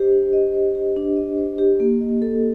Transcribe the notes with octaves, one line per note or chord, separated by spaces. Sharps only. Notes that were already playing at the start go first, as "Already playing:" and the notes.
Already playing: D4 G4 C5 D#5
D4
D#5
C5
G4
D4
D#5
C5
G4
A#3
D#5
A4